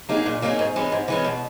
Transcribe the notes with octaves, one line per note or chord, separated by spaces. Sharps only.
F#3 A#3 D#4 G#4
A#2
F#3 A#3 D#4 G#4
G#2
E3 G#3 C#4
G#2
E3 G#3 C#4
B2